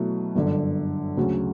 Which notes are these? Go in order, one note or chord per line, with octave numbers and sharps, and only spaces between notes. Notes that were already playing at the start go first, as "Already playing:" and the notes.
Already playing: B2 F#3 A3 E4
G1 F#2 D3
D2 C#3 F#3